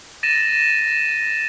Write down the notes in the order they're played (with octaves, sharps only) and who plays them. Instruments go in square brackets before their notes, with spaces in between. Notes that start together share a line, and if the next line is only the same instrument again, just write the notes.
[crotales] A6 A#6 D#7 E7